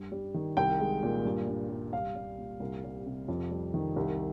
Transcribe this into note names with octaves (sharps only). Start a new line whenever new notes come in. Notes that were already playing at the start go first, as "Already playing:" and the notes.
Already playing: G2
G3
D#3
C2 G5
G#3
A#2
G2
G2
G3
C2 F5
G3
A#2
C2
G3
C3
F2
G3
D#3
C2